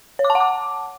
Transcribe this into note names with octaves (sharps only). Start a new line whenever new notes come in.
C#5
D6
A5
F#5
D6